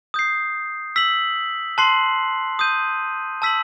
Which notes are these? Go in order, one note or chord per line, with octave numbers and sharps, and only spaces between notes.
D#6 G6 C7
E6 B6 F#7
A5 C6 F#6 C7 F#7
D#6 G6 D#7
A5 E6 B6 F#7